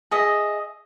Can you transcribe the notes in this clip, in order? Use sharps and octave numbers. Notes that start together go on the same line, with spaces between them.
G#4 D#5 E5